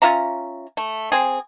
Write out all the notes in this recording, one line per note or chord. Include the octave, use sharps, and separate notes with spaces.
C#4 F4 E5 A#5
A3
C4 G#4